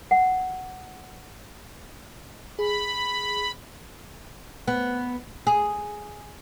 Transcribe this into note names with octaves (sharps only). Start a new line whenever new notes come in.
F#5
G#4 B5
B3
G#4